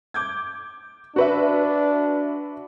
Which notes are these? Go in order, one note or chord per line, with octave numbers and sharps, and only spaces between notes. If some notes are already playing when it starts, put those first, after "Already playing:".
D6 G6 G#6
D4 F#4 B4 E5